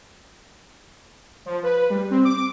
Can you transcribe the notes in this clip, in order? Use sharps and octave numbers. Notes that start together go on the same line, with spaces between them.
F3
B4
G3
C4
D6